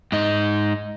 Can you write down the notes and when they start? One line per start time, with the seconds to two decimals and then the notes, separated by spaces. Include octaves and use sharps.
0.12 G#2 D#4